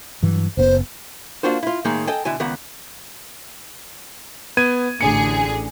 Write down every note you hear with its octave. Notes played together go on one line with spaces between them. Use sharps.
G2 E3 F#3
F#1 B2 B3 C5
A#3 D4 F4 F#4 C5
E4 F4
A2 D#3 G#3 A#3 G#4
A4 D#5 G5 G#5
B2 D3 E4 G#5
C#2 D#3 B3 F#5
B3 G#6 D#7
A1 D3 G#4 C#7